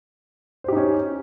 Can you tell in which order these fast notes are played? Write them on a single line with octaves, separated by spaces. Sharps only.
C5 G4 D#4 C#4